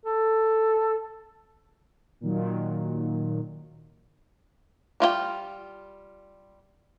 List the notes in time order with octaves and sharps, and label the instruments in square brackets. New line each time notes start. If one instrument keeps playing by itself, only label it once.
[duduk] A4
[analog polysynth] A#2 D#3 F#3
[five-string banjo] G3 F4 F#4 G5